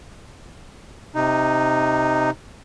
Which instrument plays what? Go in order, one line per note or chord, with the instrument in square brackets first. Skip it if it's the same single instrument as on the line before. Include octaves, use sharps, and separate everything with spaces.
[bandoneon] C3 D#4